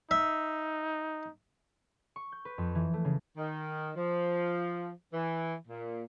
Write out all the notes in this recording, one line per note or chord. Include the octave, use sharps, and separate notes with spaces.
D#4 E5
C#6
G6
B4
F2
E3
A3
C#3
D#3
F3
E3
A#2